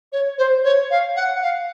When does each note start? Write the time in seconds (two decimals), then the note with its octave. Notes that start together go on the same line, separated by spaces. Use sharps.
0.12 C#5
0.38 C5
0.64 C#5
0.90 F5
1.16 F#5
1.41 F5